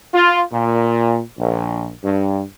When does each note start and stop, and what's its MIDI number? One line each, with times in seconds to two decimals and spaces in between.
0.13 0.41 65
0.51 1.19 46
1.38 1.88 34
2.03 2.42 43